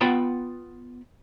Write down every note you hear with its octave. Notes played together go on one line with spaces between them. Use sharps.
B3 F4 F#5 G5 B5